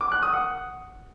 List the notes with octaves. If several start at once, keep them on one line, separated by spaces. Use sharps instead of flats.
D6
F#6
D#6
F#5